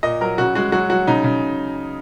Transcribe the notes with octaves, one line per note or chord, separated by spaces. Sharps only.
A#2 D#5
F#3 A#4
C#3 F#4
G#3 F#4
F#3 F#4
F#3 F#4
C#3 D#4
C#3